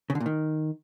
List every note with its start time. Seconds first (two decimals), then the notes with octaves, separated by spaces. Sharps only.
0.10 C#3
0.15 D3
0.20 A#2
0.26 D#3